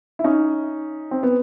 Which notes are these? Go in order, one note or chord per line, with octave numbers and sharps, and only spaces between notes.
E4
C#4 D#4
C4
B3